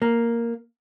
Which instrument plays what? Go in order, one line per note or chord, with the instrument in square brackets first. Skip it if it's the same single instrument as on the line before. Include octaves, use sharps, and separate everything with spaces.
[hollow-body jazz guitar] A#3